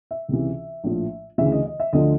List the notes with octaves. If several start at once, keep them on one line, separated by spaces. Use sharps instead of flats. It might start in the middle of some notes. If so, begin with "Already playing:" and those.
E5
C#2 C3 E3
A#1 A2 F3
D2 C#3 E3 E5
D#5
D#5
E5
D2 D3 F3 D#5